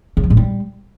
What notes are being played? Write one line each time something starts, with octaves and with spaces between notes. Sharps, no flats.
C#3
F3
A2
G3